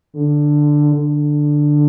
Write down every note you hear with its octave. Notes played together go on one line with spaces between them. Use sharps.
D3
D3